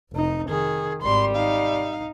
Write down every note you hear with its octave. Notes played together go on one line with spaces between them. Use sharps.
F1 D#4
D#3 G#4
G#1 G3 C6
D#4 F5